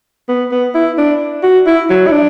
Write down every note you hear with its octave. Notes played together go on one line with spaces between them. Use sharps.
B3
B3
E4
D4
F#4
E4
F#3
E4
D4